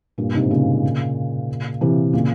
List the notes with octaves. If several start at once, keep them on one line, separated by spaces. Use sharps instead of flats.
G2 A#2
G#2 C3
A#2 C#3
C3 E3
A#2 C#3